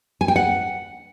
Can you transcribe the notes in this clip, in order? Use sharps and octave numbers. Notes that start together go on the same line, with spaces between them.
G#5
G5
F#5